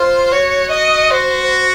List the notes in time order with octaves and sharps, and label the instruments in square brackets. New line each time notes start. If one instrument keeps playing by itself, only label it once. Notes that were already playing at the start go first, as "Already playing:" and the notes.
Already playing: [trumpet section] F4 [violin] C5
[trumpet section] F#4 [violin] C#5
[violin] D#5
[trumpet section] F#4 [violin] C5